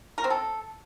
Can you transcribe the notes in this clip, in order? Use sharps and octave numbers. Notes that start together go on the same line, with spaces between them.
A#4
C4
A4